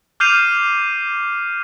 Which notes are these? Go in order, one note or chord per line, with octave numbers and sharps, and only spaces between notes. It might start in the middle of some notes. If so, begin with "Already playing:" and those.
D6 F6 G6 C7 D#7 F7